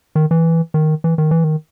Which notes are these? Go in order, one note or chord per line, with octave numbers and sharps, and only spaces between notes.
D#3
E3
D#3
E3
D#3
E3
D#3